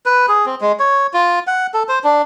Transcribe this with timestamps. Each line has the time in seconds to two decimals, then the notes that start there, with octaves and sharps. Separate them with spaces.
0.06 B4
0.28 G#4
0.46 C4
0.61 G#3
0.79 C#5
1.14 F4
1.47 F#5
1.74 A4
1.89 C5
2.04 D4